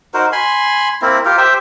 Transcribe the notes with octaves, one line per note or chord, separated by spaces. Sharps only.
D#4 F#4 A#4 C5
G#5 B5 C6
A#3 C4 E4
F4 G4 A#4
G4 C5 E5 G5